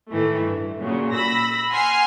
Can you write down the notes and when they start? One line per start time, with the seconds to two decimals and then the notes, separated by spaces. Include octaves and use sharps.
0.10 A2 D#3 E3 A3
0.42 G2
0.79 A#2 C#3 F#3
1.12 B5 E6 A#6
1.71 F#5 G#5 C6 F6 C7